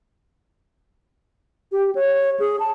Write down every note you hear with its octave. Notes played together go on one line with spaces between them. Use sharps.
G4
C#5
G#4
A5